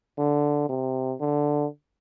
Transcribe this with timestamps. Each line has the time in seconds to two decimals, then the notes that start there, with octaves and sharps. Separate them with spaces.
0.18 D3
0.69 C3
1.20 D3